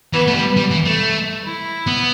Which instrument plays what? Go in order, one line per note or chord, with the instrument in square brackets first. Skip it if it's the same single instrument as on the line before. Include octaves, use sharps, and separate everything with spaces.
[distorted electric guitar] E3 [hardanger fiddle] B3
[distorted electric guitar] A3
G3
G3
E3
A3
[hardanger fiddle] E4
[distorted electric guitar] B3